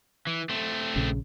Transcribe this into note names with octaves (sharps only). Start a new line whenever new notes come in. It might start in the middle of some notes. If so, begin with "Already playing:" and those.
E3
A3 C4
A#1 C#3